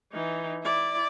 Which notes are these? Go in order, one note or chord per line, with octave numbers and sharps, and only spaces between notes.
E3 D#4
E4 D5